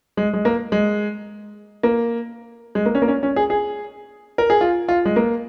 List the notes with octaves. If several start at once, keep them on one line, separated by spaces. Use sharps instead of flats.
G#3
G#3
A#3
G#3
A#3
G#3
A#3
C#4
A#3
C#4
C#4
G#4
G#4
A#4
G#4
F4
F4
G#3
A#3